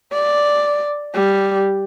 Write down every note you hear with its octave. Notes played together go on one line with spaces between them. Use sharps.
D5
G3